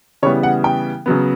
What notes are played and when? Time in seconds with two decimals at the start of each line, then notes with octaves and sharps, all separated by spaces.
0.23 C#3 E3 G3 B3 C#5
0.43 F#5
0.64 G5
1.06 C#3 F#3 B3